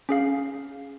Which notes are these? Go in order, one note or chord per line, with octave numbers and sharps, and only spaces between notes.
C#4 G#4 F5